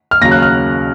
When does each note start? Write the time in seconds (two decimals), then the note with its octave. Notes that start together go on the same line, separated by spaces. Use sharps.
0.11 F6
0.21 D#2 C#3 F#3 A#6
0.31 F#6
0.42 F6